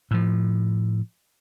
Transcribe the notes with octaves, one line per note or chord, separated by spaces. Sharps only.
A2 F3